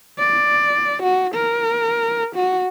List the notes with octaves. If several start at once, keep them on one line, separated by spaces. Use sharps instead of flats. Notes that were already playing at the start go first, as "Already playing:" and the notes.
D5
F#4
A#4
F#4